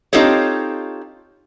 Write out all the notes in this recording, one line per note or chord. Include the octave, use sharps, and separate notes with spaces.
C4 D#4 F4 G4 A4 C#5